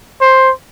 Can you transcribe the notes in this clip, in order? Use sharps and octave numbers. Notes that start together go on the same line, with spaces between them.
C5